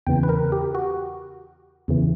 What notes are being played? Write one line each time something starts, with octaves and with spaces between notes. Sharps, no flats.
E2 C#3 E3 G5
B4
A#4
G4
F#4
E2 C#3 E3